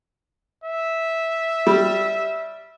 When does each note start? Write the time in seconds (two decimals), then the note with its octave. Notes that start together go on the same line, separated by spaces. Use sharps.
0.64 E5
1.67 G3